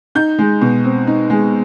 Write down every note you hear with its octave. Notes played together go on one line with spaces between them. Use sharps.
D#4 G6
G#3
B2
C4
D#4
G#3